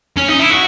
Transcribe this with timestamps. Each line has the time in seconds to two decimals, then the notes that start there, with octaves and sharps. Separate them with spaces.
0.17 C#4
0.28 D#4
0.39 E4
0.50 F#4